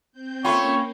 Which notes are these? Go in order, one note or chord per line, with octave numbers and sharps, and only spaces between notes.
C4 G6
A3 A#3 C#4 F4 C#5 G5 B5 C#6